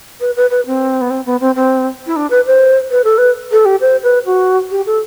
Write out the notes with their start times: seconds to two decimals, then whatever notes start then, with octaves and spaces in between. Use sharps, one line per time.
0.20 B4
0.37 B4
0.50 B4
0.66 C4
1.01 B3
1.10 C4
1.26 B3
1.41 C4
1.55 C4
2.07 E4
2.16 D4
2.30 B4
2.46 C5
2.91 B4
3.04 A4
3.18 B4
3.52 A4
3.65 G4
3.81 C5
4.03 B4
4.26 F#4
4.71 G4
4.86 A4